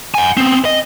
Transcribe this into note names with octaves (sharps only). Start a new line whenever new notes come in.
F#5 G#5
B3 C4
D#5